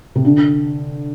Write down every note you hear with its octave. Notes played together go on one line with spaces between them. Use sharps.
C3
D3